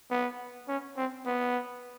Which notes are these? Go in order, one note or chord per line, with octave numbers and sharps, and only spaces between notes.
B3
C#4
C4
B3